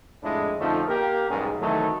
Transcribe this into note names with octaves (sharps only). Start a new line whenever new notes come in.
F2 A2 G#3 D4 E4
F2 D3 F3 A3 C#4 D#4
A#3 G4 A#4
B1 E2 G#2 G3 C#4 G#4
C2 D#3 E3 F#3 A3 D#4